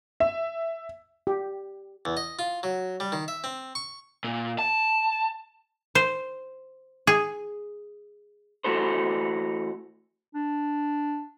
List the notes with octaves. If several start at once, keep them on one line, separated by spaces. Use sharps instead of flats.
E5
G4
E2
D#5
F4
F#3
G3
D#3
E5
C4
C#6
A#2
A5
C5
G#4
E3 A3 F#4 A4 C5
D4